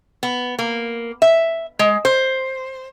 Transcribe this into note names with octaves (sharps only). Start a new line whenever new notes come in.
B3
A#3
E5
G#3
C5